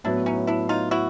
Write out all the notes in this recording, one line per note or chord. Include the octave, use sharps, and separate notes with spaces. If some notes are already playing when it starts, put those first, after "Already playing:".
A2 F#3 B3 D4 E4
C#4 D#4
D4 E4
D#4 F4
E4 F#4